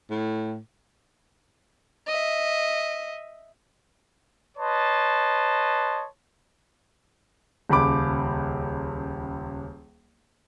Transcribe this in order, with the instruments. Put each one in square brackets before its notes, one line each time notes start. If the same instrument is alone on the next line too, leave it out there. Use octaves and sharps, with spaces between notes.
[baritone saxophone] A2
[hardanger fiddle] D#5 E5
[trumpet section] B4 C#5 D#5 A5 C6
[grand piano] D#1 C#2 B5 D6